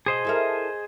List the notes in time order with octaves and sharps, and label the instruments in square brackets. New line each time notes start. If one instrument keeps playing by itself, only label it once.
[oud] B2 [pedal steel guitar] G#4 C5 D#5
[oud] E4 A4 A#4